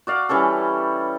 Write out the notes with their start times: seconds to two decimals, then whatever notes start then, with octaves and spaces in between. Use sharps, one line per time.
0.07 F#4 D5 F5
0.29 E3 G3 C#4 A4